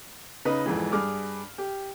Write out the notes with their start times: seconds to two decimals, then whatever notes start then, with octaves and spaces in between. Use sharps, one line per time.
0.45 C#3 D#4 B4 D#5
0.66 E1 F2 G#2 E3
0.92 G2 G#4 D6 F6
1.58 G4